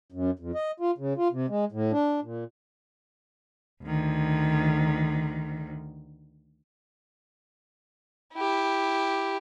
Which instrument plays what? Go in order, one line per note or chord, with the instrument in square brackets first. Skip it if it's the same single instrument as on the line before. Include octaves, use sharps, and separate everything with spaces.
[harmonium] F#2
F2
D#5
F4
C#3
F4
C3
G#3
A2
D4
A#2
[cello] D2 D#3
[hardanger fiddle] E4 G4